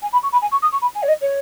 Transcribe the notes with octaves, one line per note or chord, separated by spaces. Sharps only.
G#5
B5
C#6
B5
G#5
C#6
D#6
C#6
B5
G#5
C#5
D#5
C#5